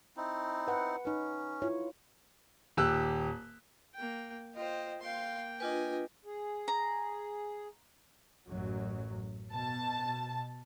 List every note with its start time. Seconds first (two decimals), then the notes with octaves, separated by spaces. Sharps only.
0.17 C4 D#4 E4
0.68 B4 F#5
1.05 C#4 D#4 B4
1.62 E4 F4 C#5
2.77 D#1 G4 E6 F#6
3.95 A#3 G5
4.55 F4 C5 D#5 G5
5.01 A#3 F5 G5 C6
5.60 D4 F4 B4 D#5 G#5
6.25 G#4
6.68 A#5
8.47 A1 F#2 F#3
9.52 B2 A5